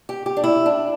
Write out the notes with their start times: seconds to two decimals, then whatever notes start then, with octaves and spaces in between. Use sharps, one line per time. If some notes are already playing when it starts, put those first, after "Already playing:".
0.09 G4
0.26 G4
0.37 D4
0.44 E4
0.66 D4